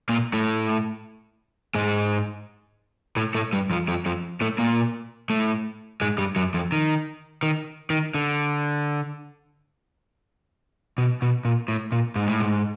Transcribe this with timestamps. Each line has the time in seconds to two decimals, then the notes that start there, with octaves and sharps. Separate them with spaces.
0.09 A#2 A#3
0.33 A2 A3
1.75 G#2 G#3
3.16 A2 A3
3.35 A2 A3
3.53 G2 G3
3.70 F2 F3
3.88 F2 F3
4.06 F2 F3
4.41 A2 A3
4.58 A#2 A#3
5.30 A2 A3
6.01 G#2 G#3
6.18 G2 G3
6.36 F#2 F#3
6.54 F2 F3
6.72 D#3
7.43 D#3
7.90 D#3
8.15 D3
10.98 B2
11.22 B2
11.45 A#2
11.68 A2
11.92 A#2
12.16 G#2
12.28 A2
12.40 G#2